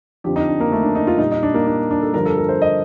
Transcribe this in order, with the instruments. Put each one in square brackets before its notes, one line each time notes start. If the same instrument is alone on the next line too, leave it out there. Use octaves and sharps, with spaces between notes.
[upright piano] F2 D3 F3 G4
D#4
D4
A#3
A3
D4
D#4
F4
A#2 G3 D#4
D#4
D4
A#3
D4
D4
A4
G2 D3 F3 A#4
A4
A#4
C5
D#5